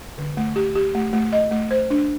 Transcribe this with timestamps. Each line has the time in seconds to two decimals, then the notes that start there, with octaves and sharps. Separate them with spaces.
0.18 D3
0.37 A3
0.56 G4
0.75 G4
0.95 A3
1.13 A3
1.32 D#5
1.51 A3
1.71 C5
1.90 D4